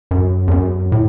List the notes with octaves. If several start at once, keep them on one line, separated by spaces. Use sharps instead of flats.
F#2
E2
F#2
A2